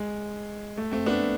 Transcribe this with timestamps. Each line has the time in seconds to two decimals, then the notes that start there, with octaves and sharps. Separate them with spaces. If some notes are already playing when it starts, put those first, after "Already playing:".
Already playing: G#3
0.77 A3
0.91 A3 C4
1.06 B3 D4